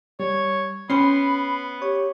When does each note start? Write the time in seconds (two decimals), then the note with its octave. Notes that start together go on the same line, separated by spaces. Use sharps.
0.20 G3 C#5
0.90 B3 C#4 C5 B5 C7
1.82 G4 C#5